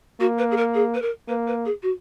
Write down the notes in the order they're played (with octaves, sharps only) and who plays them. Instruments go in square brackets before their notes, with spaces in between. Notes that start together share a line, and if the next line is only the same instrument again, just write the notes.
[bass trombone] A#3 [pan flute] F#4
[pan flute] B4
G#4
A#4
G#4
B4
A#4
[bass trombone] A#3 [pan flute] B4
[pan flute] B4
G#4
F#4